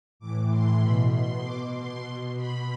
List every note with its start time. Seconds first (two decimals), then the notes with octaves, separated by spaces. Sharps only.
0.19 A2 E3 D6
0.49 C6
0.80 B2 B5
1.12 C6
1.43 B2 D6
1.73 C6
2.04 B2
2.35 B5